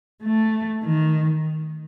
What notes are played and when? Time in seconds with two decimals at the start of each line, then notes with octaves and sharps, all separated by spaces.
0.23 A3
0.83 D#3